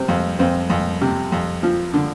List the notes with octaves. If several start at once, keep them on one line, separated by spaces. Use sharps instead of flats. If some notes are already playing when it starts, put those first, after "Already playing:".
Already playing: C3 C4
F2
F2 C4
F2
C3
F2
F3
D3